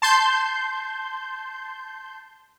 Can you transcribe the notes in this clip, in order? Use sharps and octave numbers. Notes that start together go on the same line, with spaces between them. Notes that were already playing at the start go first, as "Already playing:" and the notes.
A5 C6 G6